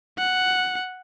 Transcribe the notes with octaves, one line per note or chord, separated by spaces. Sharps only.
F#5